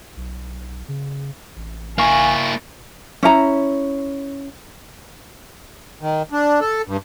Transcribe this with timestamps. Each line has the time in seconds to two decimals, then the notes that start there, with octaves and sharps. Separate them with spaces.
0.17 B1
0.88 C#3
1.56 A1
1.98 A#3 E4 F5 G#5 C#6
3.23 C#4 E4 A#5
6.01 D#3
6.32 D4
6.61 A4
6.87 G2